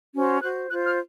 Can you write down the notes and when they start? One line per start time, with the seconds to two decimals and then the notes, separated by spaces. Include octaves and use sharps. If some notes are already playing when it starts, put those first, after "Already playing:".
0.13 C#4 F#4 C5
0.41 F#4 C5 F#6
0.70 F4 C5 F#6
0.84 F6